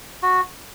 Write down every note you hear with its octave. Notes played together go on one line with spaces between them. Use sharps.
F#4